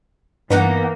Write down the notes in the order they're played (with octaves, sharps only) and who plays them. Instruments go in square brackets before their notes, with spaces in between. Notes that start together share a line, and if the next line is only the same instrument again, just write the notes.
[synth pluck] G2 [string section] E3 A#3 [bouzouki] B3 D#4 F#5